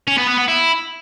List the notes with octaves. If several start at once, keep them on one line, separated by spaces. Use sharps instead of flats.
C#4
B3
B3
B3
E4